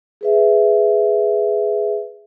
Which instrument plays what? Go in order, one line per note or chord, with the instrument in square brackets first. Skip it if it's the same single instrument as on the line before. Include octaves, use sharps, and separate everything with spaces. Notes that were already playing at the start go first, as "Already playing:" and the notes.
[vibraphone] G#4 B4 E5